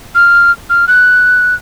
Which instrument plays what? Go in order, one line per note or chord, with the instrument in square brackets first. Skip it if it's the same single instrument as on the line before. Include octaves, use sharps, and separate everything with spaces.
[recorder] F6
F6
F#6